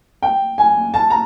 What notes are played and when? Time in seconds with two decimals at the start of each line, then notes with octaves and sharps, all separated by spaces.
0.22 G5
0.58 G#5
0.94 A5
1.10 A#5